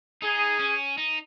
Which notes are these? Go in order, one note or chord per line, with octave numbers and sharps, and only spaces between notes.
D#4 G#4
C#4
D#4